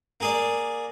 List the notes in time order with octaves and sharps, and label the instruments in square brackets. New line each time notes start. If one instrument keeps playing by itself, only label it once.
[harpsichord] A#3 G#4 D5